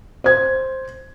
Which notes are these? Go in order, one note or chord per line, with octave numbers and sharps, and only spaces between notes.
C5 G#6